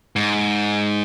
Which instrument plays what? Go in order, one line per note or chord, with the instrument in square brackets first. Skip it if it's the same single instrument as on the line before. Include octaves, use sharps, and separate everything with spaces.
[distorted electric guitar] G#2